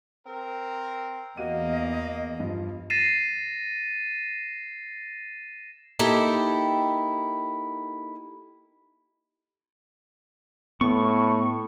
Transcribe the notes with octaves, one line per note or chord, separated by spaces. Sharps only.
C4 A#4
E2 A#3 F#4 D#5 D#7
G2 F3
A6 A#6 C7 D#7 E7
A#3 D#4 E4 G4 A4 G5
A2 B3 C#6